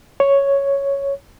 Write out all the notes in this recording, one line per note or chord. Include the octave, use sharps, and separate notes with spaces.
C#5